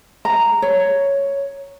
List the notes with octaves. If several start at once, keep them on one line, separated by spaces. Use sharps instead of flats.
A#5
C#5